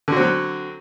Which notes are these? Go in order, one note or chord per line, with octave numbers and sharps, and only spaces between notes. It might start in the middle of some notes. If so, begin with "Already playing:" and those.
D3 F#3 C4 F#4